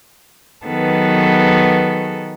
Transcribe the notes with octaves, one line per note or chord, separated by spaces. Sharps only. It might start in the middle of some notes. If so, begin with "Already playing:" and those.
D#3 F#3 B3 G#4 A4 B4